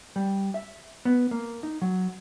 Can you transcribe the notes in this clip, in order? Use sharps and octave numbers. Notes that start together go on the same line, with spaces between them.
G3
E5
B3
A#3
D#4
F#3